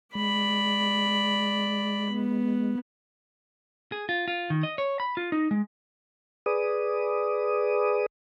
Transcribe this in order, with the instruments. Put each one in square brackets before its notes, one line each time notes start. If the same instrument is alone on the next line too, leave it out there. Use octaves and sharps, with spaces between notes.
[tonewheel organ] G#3 [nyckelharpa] D5 B5
[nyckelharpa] B3
[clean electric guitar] G#4
F4
F4
D#3
D#5
C#5
B5
F4
D#4
G#3
[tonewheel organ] G#4 B4 D5 D#6